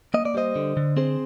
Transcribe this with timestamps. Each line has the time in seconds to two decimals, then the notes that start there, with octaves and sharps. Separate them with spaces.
0.14 A#3 D#5
0.25 D5
0.35 G3 C5 D#5
0.56 D3
0.77 D3
0.97 C4 G#4 C5